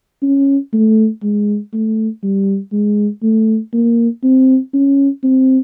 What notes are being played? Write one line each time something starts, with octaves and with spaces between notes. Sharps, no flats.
C#4
A3
G#3
A3
G3
G#3
A3
A#3
C4
C#4
C4